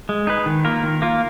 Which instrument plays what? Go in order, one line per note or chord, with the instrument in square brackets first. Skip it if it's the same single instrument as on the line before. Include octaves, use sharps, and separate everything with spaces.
[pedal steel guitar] G#3
D#4 G#4 B4
D#3
A#3 F4 A#4
D#3
A#3 F4 A#4